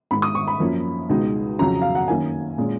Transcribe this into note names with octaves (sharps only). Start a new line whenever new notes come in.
G#2 D#3 G#3 B5
D#6
C#6
B5
F#2 F3 A#3 C#4
C#2 B2 G#3 D#4
F2 C#3 F#3 C#4 A#5
F5
F#5
F#2 D#3 A#3 C#4 G#5
A#2 G#3 C#4